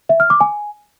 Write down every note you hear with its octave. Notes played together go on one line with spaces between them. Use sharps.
E5
F6
D6
G#5